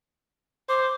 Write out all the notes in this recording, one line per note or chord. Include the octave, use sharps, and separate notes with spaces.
C5 D6